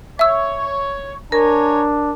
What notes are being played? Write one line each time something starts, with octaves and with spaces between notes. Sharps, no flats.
C#5 E5 E6
D4 A#4 C#5 G#5 A#5